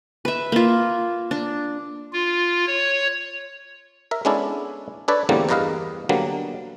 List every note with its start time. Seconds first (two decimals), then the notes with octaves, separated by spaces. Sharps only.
0.25 B4 E5
0.52 A#3 F4
1.31 D4
2.13 F4
2.67 C#5
4.11 A#4 E5
4.25 G#3 B3 C#4 D4 E4 A4
5.08 D4 A4 B4 C#5 D5
5.29 E2 A2 D3 G3 A#3 C4
5.49 E2 G2 A#4 B4 D#5 F5
6.09 B2 D3 F#3 G3 A#3